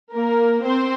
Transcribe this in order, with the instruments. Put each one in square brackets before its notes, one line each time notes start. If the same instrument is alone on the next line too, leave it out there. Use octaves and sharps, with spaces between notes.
[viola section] A#3 A#4
C4 C5